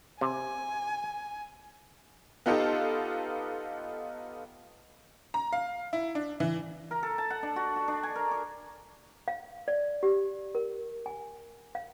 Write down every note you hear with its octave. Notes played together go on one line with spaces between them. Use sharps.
C3 G#5
B3 D#4 F4 G4 A4
A#5
F5
E4
D4
E3
A#4
A4
A5
F#5
D4
F#4
F#4
D4
G#5
A#4
D6
F5
D5
G4
A#4
G#5
F5